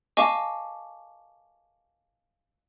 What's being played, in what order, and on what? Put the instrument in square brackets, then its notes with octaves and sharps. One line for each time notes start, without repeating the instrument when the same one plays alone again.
[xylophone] D#5 F5 G#5 A5 C#6 D6